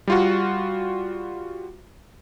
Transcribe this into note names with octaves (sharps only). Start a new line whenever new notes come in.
G3 F4 F#4